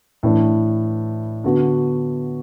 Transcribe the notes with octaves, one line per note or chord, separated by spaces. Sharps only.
A2 E3 D4
D3 B3 F#4